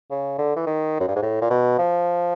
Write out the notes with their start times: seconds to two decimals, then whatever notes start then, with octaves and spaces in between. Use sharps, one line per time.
0.10 C#3
0.38 D3
0.56 E3
0.66 D#3
1.00 F#2
1.08 G2
1.15 G#2
1.22 A2
1.42 A#2
1.50 B2
1.79 F3